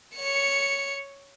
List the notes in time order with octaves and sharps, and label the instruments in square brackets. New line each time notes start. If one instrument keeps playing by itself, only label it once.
[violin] C#5 C#7